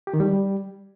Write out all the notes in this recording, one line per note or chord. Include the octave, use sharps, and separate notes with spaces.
G4
D#3
G3